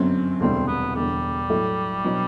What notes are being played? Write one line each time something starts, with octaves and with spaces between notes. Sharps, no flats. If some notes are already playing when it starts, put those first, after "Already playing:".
Already playing: G1 F#2 F#3 C4
E1 D2 C3 G3 C4
B3
E1 E2 D3 G3
A2 F#3 A3
B2 F#3 B3 D4